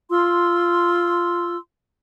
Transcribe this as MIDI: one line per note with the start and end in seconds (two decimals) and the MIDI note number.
0.11 1.57 65
0.11 1.57 84
0.11 1.57 88